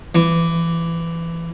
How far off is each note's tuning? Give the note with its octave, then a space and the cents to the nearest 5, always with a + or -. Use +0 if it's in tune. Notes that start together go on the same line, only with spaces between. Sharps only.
E3 +20